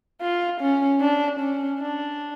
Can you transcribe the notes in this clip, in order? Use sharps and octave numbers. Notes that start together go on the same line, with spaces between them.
F4
C#4
D4
C#4
D4